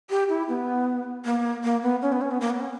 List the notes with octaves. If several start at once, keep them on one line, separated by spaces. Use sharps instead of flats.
G4
E4
B3
A#3
A#3
B3
C#4
B3
C#4
B3
A#3
B3
C#4